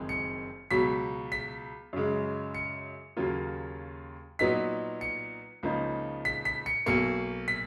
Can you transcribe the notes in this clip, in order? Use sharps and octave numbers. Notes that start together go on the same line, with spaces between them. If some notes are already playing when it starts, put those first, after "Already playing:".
Already playing: F#1 F2 D#3 G#3
C#7
C#2 B2 F#3 B6
B6
F#2 C#3 G#3
C#7
D#2 C#3 F#3 A#3 F4
A#2 F#3 B3 D#4 B6
C#7
C#2 C#3 F3 A#3 D#4
B6
B6
C#7
B1 B2 A#3 C#7
B6